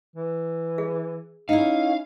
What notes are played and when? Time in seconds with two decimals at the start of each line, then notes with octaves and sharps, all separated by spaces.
0.16 E3
0.78 G#4
1.49 C#4 D#4 E4 F5